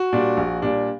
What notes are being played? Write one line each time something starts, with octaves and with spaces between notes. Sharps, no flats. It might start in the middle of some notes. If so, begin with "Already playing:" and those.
Already playing: F#4
A#2 G3 D4
A#1
A#2 G3 D4